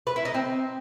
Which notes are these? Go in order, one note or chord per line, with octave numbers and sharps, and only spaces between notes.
B4
E4
D#4
C4